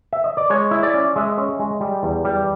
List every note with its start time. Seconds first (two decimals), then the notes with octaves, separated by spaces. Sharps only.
0.13 E5
0.24 D#5
0.37 D5
0.50 G#3 C#5
0.71 E4
0.83 D5
0.94 C#4
1.16 G#3 E5
1.38 C#4
1.59 G#3
1.80 G3
2.03 E2
2.25 G3